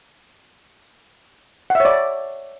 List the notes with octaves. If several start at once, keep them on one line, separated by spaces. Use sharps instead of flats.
C#5 D5 E5 F#5